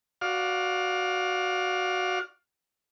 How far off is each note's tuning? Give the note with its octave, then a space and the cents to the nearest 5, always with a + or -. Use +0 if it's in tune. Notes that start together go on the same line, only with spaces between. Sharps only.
F#4 +0 D5 +0 F5 +20